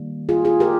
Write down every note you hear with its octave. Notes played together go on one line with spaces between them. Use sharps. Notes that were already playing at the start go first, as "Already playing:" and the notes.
Already playing: D#3 G3 A#3
F4 G#4
F4 G#4
G4 A#4